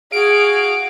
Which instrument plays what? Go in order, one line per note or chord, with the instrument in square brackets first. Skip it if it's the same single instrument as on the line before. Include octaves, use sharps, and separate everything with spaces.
[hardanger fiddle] F#4 F5 [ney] G#4 [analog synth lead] D7